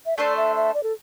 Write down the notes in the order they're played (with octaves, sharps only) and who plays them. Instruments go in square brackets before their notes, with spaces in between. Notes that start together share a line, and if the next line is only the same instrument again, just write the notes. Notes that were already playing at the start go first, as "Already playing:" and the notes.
[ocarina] E5
[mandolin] A3 D4 A4 C5 [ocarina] D5
[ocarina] E5
E5
D5
A4